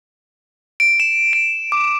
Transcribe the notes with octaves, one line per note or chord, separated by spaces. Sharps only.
D7
E7
D7
D6